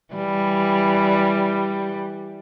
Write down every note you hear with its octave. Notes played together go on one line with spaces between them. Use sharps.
E3 G3